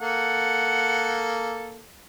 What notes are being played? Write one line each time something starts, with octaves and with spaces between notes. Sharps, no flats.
A#3 A4 F#5